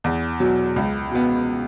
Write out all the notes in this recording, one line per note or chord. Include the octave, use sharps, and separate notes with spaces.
E2
B2 F#3
C#2
B2 B3